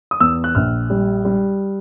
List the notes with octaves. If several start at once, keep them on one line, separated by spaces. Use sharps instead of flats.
D#6
E2 E6
F#6
A#1 F6
G3
G3